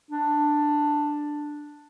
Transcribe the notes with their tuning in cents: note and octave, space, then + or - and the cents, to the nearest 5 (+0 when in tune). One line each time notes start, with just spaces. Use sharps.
D4 +5